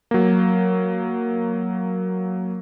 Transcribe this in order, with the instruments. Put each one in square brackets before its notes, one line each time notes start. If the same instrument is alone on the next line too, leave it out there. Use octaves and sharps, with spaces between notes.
[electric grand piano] F#3 A#3